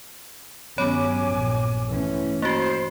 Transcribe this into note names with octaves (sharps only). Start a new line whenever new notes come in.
G2 D#3 F#3 B3 C#4 C#5 G#5 D6
A#1
E3 A3 C#4
A#3 F#4 C5 A#5 A6